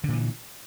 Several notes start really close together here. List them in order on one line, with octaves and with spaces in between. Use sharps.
D3 A#2 E3